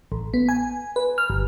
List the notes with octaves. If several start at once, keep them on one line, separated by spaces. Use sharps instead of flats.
A1
B3
G#5
B4
F6
G1